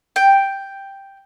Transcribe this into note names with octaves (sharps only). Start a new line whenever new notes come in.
G5